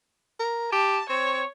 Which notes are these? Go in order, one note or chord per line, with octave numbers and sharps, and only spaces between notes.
A#4
G4 A5
C4 C#5